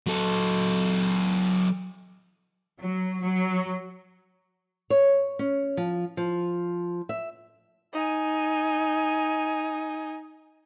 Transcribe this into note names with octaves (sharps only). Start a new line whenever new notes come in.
F#3 A4
F#3
F#3
C#5
C#4
F3
F3
E5
D#4 G#5